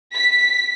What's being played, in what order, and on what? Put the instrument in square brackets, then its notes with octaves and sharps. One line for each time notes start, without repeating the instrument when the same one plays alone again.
[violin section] B6